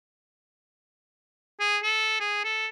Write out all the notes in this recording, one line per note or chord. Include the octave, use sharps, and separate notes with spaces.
G#4
A4
G#4
A4